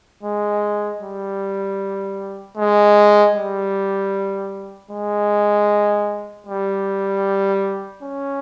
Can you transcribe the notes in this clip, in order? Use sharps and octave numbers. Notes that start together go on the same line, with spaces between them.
G#3
G3
G#3
G3
G#3
G3
C#4